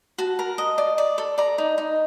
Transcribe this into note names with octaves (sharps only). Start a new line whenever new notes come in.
F#4 A5
A#4
D#5
D5
D5
A4
D5 A#5
D#4
D#4